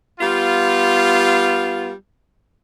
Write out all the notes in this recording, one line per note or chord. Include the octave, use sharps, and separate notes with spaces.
G3 B3 F4